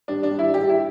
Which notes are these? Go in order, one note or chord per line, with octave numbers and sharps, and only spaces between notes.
G3 D4
D4
G3
E4
G3 G4
E4